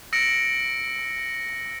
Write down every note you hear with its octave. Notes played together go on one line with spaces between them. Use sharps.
E6 A#6 C#7 D7